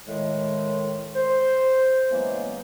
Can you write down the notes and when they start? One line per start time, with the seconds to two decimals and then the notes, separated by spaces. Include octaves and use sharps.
0.08 A2 D#3 G#3
1.15 C5
2.11 C#3 E3 F#3 G#3 A#3 B3